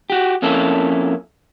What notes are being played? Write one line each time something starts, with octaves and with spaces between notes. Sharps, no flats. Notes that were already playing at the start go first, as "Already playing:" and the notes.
F#4 G4
F2 A#3 C#4 E4 A4